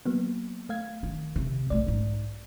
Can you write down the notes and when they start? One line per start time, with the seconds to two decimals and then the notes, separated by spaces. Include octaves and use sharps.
0.06 F#3 A#3 B3
0.69 A3 F5 G#6
1.03 D#3
1.36 C3
1.70 B1 A#2 A3 D5
1.86 G#2 D#4